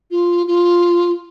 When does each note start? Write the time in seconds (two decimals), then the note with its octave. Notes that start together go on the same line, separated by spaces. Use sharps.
0.11 F4
0.47 F4